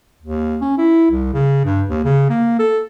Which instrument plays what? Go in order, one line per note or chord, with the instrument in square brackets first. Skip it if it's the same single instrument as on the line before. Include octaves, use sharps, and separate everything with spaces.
[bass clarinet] D#2
C#4
E4
C2
C#3
G2
D#2
C#3
A#3
A4